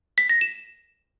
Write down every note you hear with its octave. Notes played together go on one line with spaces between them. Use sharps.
B6
A#6
E7